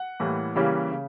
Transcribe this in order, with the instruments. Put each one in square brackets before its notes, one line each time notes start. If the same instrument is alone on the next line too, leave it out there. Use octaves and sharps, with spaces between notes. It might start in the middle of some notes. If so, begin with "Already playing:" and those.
Already playing: [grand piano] F#5
A2 E3 G3 A#3
C#3 E3 G3 A#3 C#4
C#3